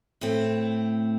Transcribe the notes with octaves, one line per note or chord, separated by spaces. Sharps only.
A2 A3 C4